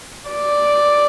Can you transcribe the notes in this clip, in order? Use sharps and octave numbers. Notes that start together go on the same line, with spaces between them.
D5